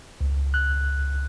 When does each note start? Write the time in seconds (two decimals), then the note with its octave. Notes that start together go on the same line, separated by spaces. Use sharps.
0.21 C#2
0.54 F#6